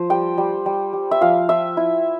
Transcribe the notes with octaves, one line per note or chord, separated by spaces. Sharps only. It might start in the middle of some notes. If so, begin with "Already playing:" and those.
Already playing: F3 C5
G3 G5
G3
G3
G3
E5
F3 F5
F3 E5
E4